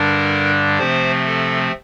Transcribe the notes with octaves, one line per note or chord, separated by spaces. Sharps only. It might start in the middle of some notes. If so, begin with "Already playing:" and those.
Already playing: G2 D3 G3 D4 A#4
C3 F3 A3 C4 C5
A4